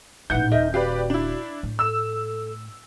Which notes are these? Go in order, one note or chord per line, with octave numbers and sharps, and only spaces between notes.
A1 A#2 D#4 E4 B4 F#5 G6
D#1 A#4 D#5 E5
F#4 G4 B4 D5 F5
D4 E4
A2
A4 E6 E7